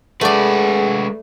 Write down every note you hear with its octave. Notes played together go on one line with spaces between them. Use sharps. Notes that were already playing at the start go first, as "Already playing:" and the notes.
G#3 A3 G#4 B4 D5 F#5